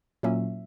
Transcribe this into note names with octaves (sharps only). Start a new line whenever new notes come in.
A#2 F#3 A#3 C#4 E4 E5